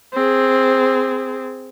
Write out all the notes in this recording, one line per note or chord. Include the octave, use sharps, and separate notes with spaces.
C4 G#4